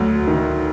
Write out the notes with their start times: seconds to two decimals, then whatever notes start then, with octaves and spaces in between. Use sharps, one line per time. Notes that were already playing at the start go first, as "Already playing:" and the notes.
Already playing: D2 F#3
0.27 D#3